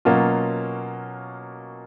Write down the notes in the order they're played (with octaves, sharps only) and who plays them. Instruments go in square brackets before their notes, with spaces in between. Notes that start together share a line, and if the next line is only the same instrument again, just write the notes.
[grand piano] B2 F#3 A#3 C#4 F4